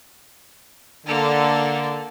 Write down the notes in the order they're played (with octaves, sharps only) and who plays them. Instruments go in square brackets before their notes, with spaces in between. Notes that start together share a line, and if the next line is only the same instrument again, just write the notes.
[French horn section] D3 [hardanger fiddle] A#3 A4